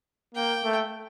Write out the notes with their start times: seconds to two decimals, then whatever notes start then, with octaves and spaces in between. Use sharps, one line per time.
0.34 A#3 G5
0.64 A3